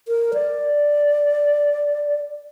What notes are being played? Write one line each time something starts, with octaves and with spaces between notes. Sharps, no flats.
A#4
D5